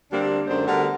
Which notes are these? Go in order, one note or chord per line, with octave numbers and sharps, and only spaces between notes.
D2 G3 A#3 C4 D4
F#2 D3 G#3 D4 C5
D3 G3 A3 B3 F#4 A#4